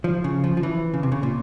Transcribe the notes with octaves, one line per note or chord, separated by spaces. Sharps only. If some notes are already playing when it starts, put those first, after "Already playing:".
F3
C#3
F3
F3
E3
C#3
C3
C#3
A#2